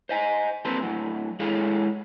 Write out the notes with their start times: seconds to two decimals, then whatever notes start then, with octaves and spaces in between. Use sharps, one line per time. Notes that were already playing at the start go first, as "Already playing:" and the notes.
0.09 C5 D#5 G#5
0.65 G3 A#3 C4 A4 B4 C5
0.83 A2 F#3
1.40 G#3 E4 G#4 A4 C#5 F5